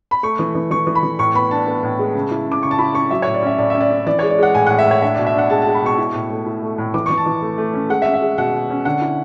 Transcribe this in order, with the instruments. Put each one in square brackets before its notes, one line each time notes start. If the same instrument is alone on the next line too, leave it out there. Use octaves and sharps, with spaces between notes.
[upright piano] B5
A3 C#6
E3
E3
E3 C#6
E3
B5
E3
A2 C#6
B3 B5
D4 A5
B3
A2
G#3
C#3
E4
C#3 D6
C#3 C#6
A5
E4 B5
C#4 C#6
F#3 E5
A2 C#5
D5
C#4 E5
A2 D5
C#4 E5
D5
C#4
E3 D5
G#3 C#5
D5
G#3 F#5
A2 G#5
A2 F#5
E5
A2 C#5
D4 E5
B2 D5
E5
D4 F#5
G#3 A5
G#3 A5
B5
B2 C#6
E4
A2
A3
E4
A3
A2
E3 D6
E3 C#6
A5
E3
A3
A3
C#4
G#3 F#5
E5
C#4
E5
G#3
B2 F#5
B2
C#4
D3 F#5
E4